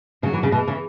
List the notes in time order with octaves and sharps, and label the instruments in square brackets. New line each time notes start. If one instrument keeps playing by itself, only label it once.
[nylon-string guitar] C#3 [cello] F#3
[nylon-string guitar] E3
C#3
[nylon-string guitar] B2 [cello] E3
[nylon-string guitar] C#3